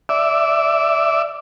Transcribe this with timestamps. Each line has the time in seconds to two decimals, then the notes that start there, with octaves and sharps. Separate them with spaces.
0.09 D5 E5